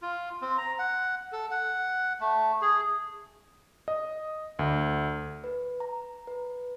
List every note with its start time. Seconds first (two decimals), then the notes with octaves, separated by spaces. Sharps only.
0.02 F4
0.42 C4
0.58 A#5
0.79 F#5
1.32 A4
1.51 F#5
2.21 A3
2.61 G#4
3.88 D#5
4.59 D2
5.44 B4
5.80 A#5
6.27 B4